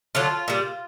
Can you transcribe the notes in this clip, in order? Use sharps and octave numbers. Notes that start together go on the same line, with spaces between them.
D3 F#3 A3 F4
A#2 G3